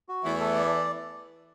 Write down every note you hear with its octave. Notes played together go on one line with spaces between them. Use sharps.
F#4
E2 E3 A3
A4
D5